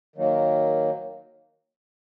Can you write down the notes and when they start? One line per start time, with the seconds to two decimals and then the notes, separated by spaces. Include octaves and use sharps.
0.16 D#3 F#3 A#3